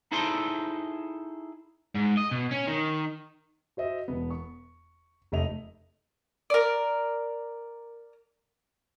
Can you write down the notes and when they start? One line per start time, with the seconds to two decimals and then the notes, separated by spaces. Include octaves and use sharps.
0.12 D#4 E4 G#4 A4 C5 C6
1.95 G#2
2.17 D#5
2.31 B2
2.51 C#4
2.67 D#3
3.77 F#4 C5 D#5 E5
4.08 E1 B3
4.31 C#6
5.32 F1 A3 D#5 F7
6.50 A#4 D5